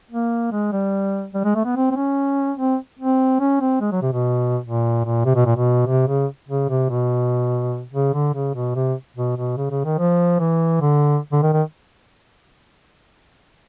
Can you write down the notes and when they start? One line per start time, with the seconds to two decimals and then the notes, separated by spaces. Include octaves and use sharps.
0.11 A#3
0.52 G#3
0.72 G3
1.34 G3
1.45 G#3
1.55 A3
1.65 B3
1.76 C4
1.91 C4
1.96 C#4
2.58 C4
2.99 C4
3.40 C#4
3.61 C4
3.81 G#3
3.92 F#3
4.02 C3
4.12 B2
4.64 A#2
5.05 A#2
5.25 C3
5.35 B2
5.46 A#2
5.56 B2
5.87 C3
6.08 C#3
6.48 C#3
6.69 C3
6.90 B2
7.93 C#3
8.13 D3
8.34 C#3
8.54 B2
8.75 C3
9.16 B2
9.37 B2
9.57 C#3
9.71 C#3
9.85 D#3
9.98 F3
10.39 E3
10.81 D3
11.32 D3
11.42 D#3
11.53 D#3